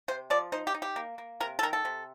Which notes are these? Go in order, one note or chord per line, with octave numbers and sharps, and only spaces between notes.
C3 C5
F3 D5
D#4 C5
G4
D#4
G4
A#3
A#3
C3 A#4
A4
D#3 A#4
A4
C3